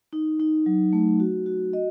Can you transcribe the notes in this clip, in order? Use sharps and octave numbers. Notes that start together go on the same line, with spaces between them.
D#4
D#4
F#3
A3
F#4
F#4
D#5